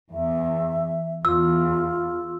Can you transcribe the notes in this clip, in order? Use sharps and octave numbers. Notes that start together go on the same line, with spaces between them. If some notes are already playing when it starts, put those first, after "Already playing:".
E2 E5
E2 F4 E6